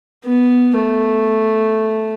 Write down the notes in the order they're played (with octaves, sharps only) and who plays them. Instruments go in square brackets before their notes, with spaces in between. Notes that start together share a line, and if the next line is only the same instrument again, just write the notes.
[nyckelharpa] B3
A3